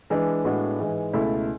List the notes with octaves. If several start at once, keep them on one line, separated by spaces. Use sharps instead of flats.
E3 G#3 D4
A2 G#3 B3 D4 F#4
G#2 E3 G#3
C#2 B2 A3 E4 A4